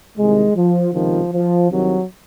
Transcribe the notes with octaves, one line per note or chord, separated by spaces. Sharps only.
C2 C3 D#3 G#3
F3
C#2 C3 D#3 F3
F3
C2 C3 D#3 F#3